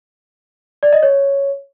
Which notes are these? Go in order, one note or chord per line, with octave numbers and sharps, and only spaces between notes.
D5
D#5
C#5